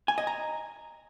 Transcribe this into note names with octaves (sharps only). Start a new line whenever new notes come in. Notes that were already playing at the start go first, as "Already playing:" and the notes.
G#5
D#5
A#5